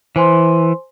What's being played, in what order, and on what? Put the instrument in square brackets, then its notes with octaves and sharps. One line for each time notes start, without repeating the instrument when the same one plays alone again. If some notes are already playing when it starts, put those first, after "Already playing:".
[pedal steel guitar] E3 [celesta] C5 G#5 C6